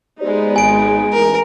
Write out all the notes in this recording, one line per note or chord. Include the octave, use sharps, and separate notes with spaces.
G#3 B3 D#4 G4 C5 D5
G#1 G#5 D7
A1 A#4